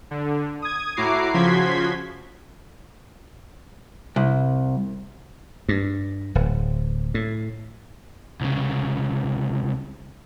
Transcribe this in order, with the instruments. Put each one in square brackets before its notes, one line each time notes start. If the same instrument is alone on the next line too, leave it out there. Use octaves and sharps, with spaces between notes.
[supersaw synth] D3
D#6 G#6
A2 E4 F#4 A#5 D6 C7
C#3 F3 F#4 C6 G#6 B6
[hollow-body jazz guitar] C2
[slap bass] G2
D1
A2
[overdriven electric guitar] C2 C#3